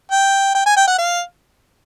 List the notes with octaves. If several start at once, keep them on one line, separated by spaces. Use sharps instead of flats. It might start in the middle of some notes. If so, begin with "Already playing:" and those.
G5
G5
G#5
G5
F#5
F5